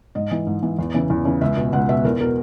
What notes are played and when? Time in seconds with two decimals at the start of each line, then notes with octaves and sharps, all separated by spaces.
0.15 G#2 D#5
0.31 E3
0.47 G#2
0.63 E3
0.79 E2
0.94 C#3 E3
1.10 E2
1.25 C#3 E3
1.41 C#2 E5
1.57 B2
1.73 C#2 F#5
1.89 B2 E5
2.05 E2 A#4
2.20 B2 A#4